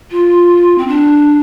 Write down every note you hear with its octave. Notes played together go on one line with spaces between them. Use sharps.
F4
C4
D4